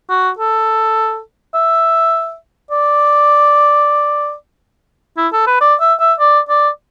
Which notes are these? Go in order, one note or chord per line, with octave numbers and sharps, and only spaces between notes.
F#4
A4
E5
D5
E4
A4
B4
D5
E5
E5
D5
D5